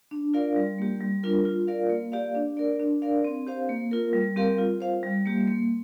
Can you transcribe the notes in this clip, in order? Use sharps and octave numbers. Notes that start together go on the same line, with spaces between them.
D4
F4 A#4 D5 F5
G3
A#3 G4
G3
D4 F4 A#4
F4
A#4 D5 F5
A#3
G4 D5 F5
D4
A#4 D5
D4
A#4 D5 F5
C4
G4 C5 F5
A#3
F4 A#4
G3
C4 G4 A#4 F5
F4
C5 F5
G3
A#3 G4
A#3